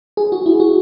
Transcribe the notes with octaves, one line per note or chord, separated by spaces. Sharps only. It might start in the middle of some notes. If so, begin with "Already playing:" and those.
G#4
F#4
E4
F#4